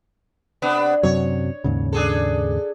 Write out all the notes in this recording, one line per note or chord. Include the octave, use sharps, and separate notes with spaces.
C3 B3 D4
F#2 C3 F#3 C#5
D#2 G#2 C#3
D4 G#4 A4